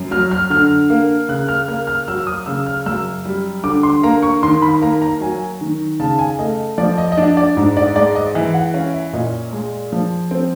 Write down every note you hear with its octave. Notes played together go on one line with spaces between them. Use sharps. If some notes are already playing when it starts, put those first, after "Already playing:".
Already playing: F#2
F#3 F6
F6
D3 F6
A#3
C#3 F#6
F6
A#3 F6
F6
F#3 E6
D#6
C#3 E6
F6
F#2 E6
G3
D3 D6
C6
A#3 A#5
C#6
D#3 C6
B5
A#3 A#5
A#5
F#3 G#5
D#3
C#3 A5
G#5
A3 D#5
F3 D5
D#5
D#5
D4 D5
D5
G#2
D5
G#3 D5
D#5
E3 E5
F#5
C#4 F5
E5
A#2 D#5
G#3
F3
C4